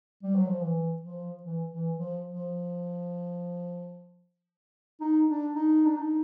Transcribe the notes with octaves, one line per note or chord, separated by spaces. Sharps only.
G3
F#3
F3
E3
F3
E3
E3
F3
F3
D#4
D4
D#4
D4
D#4